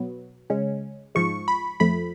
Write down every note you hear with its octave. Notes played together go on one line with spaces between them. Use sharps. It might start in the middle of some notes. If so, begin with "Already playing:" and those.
Already playing: B2 F#3 B3
C#3 G#3 C#4
G#2 F3 G#3 C#6
B5
F2 F3 A3 B5